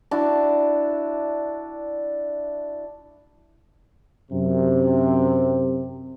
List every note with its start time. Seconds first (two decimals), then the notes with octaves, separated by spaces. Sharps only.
0.11 D4 E4 F#4
4.32 F#2 C3